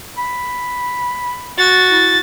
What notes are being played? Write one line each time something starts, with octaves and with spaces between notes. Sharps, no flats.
B5
F#4 A6
E4